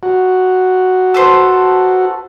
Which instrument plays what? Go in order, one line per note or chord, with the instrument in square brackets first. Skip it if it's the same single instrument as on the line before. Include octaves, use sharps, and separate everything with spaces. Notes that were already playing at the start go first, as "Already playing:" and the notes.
[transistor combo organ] F#4
[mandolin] A4 B4 C5